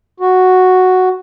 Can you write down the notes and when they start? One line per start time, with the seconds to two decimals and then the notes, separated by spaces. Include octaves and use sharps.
0.20 F#4